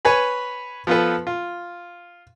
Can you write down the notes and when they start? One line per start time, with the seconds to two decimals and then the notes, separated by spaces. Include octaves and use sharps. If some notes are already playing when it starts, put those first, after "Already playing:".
0.05 B4 C#5 G#5 B5
0.87 F3 B3 F4 A4 B4
1.27 F4